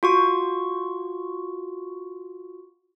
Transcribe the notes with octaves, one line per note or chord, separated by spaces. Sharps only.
F4 F#4 C#6